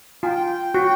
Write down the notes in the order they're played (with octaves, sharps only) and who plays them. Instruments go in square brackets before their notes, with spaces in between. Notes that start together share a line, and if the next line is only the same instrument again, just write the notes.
[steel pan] F4 [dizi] G#5
[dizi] G5
[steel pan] F#4